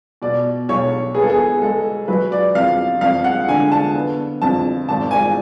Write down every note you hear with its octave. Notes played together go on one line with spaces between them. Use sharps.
B2 D5
B1 C#5
B3 G#4
A4
G#4
G#3 A4
F#3 B4
D5
F2 F5
F2 F5
F#5
D3 G#5
A5
B3
F2 A5
G#1 A5
G#5